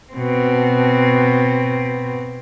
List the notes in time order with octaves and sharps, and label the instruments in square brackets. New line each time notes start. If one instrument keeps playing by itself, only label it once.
[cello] B2 C4